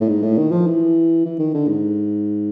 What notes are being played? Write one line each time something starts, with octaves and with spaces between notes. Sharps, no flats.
A2
G#2
A2
D#3
F3
E3
E3
D#3
D3
G#2